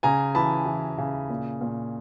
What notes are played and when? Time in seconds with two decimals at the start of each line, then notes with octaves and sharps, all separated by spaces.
0.03 C#3 G#5 A#5
0.35 E3 A5 B5
0.66 E3
0.98 C#3
1.29 A#2
1.61 A#2